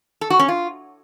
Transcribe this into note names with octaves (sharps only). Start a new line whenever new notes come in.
A4
F#4
C#4
F4